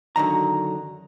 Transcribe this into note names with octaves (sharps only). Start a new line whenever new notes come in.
F#2 D3 D#3 A#5